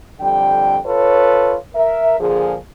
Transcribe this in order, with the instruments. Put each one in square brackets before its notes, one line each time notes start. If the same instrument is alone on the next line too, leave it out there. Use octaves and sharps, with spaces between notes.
[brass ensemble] F2 D3 G3 G5
F4 A4 B4 C#5
A#4 E5
A#2 D3 F3 G#4